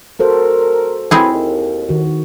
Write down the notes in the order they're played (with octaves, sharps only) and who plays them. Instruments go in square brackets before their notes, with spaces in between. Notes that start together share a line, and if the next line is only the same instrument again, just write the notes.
[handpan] F#4 A4 C5 [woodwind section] A#4
[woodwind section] F#3 A3 B4 [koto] C4 E4 G#4
[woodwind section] D#2
[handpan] D#3 F#4